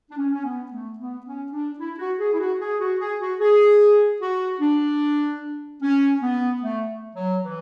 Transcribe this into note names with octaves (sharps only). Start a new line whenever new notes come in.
D4
C#4
C#4
B3
A3
B3
C#4
D4
E4
F#4
G#4
E4
F#4
G#4
F#4
G#4
F#4
G#4
F#4
D4
C#4
B3
A3
F#3
E3